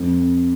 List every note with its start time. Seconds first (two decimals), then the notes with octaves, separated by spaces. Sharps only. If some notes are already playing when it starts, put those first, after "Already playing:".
Already playing: F2